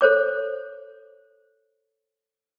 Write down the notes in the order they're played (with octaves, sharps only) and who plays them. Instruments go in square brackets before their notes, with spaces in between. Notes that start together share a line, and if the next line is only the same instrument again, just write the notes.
[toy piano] A4 C5 C#5 D6